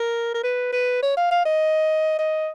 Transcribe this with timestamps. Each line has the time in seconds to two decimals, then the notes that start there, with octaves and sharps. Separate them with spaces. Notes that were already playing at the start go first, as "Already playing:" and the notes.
Already playing: A#4
0.34 A#4
0.44 B4
0.73 B4
1.02 C#5
1.17 F5
1.31 F5
1.45 D#5
2.19 D#5